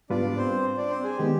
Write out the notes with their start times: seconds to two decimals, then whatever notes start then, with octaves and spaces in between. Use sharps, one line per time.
0.10 G#2 G3 B3 D4 F4 B4 D5
0.37 C4 C5
0.77 D4 D5
0.90 C4 C5
1.04 G#4
1.17 D#3 G#3 B3 G4